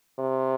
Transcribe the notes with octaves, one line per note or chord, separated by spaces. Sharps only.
C3